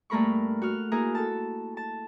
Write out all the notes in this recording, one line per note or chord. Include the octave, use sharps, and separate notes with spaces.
G2 A3 A#3 A#4 B5 C#6
F#4 F6
A#3 E4 G#4 A#4
A4 A5
A5